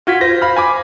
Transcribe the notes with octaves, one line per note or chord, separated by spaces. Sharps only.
F4 F#4 G#6 B6
C5 A#6
F5 B5 F6
G#5 B5 D6